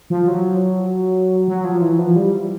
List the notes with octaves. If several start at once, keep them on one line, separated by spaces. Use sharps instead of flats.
F3
F#3
F#3
F3
E3
F3
G3